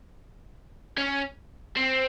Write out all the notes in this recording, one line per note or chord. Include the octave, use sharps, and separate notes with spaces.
C#4
C4